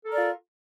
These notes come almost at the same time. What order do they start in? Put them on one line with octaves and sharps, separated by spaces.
A4 A#4 D5 F4